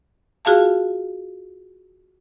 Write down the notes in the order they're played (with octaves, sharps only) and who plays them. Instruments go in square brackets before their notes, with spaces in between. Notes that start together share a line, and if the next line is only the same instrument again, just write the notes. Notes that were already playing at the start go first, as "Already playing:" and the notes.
[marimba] F4 F#4 G#4 F5 A5